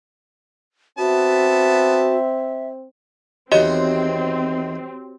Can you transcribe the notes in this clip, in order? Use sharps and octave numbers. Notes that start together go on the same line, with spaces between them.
B3 C4 F#4 E5 A5
E2 D#3 C4 F#4 G4 C#5 D#5 A#5